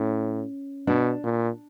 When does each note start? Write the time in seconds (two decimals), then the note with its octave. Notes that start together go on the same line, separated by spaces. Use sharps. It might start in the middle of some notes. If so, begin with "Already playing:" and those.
Already playing: A2 C#4
0.87 B2 D4
1.24 A#2